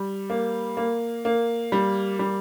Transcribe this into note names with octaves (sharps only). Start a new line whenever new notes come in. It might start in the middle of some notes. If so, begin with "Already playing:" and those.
Already playing: G3
A#3
A#3
A#3
G3
G3